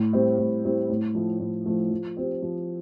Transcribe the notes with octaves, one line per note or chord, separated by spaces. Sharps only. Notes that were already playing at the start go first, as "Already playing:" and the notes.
Already playing: A2
G3 C4 E4
A2
G3 C4 E4
A2
F3 A3
A2
F3 A3
F3
C4 G4
F3